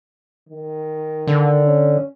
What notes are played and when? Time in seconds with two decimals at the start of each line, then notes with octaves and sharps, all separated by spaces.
0.49 D#3
1.27 D3
1.66 C#4